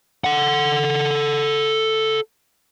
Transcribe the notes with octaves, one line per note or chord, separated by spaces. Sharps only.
A4 F#5